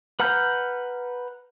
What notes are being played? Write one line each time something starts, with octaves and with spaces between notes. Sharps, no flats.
B4 F#5 A#5 F6 G6